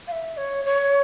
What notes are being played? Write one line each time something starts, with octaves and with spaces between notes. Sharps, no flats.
F5
E5
C#5
C#5